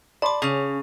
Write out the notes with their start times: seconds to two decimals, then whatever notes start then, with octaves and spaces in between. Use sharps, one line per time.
0.22 D5 A5 B5 C6 D6
0.42 C#3 C#4 G#4 D#7 F7